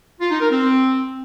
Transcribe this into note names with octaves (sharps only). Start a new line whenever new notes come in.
F4
D#4
A#4
C4